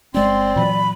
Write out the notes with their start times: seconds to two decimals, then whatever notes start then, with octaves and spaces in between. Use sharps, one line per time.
0.14 G1 G#3 C4 C#4 D5 C6
0.56 A#2 E3 F#3 B5